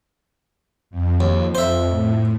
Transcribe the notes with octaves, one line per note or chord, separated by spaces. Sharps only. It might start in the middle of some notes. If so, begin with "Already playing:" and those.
F2
D#2
C5 E5
A2